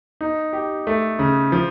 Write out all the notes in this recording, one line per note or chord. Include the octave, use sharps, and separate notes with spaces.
D#4
G4
A3
C#3
F3